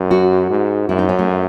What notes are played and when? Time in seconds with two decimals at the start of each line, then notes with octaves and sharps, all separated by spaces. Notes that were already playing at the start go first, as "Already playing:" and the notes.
Already playing: F#2
0.11 F#4
0.50 G#2
0.89 F#2 E4
0.99 D#4
1.09 C#4
1.19 A3